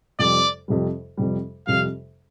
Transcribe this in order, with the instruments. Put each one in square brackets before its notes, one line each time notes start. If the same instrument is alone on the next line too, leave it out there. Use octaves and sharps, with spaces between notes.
[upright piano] F2 C3 G3 [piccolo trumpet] D5
[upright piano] F2 C3 G3
F2 C3 G3
[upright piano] F2 C3 G3 [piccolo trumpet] F5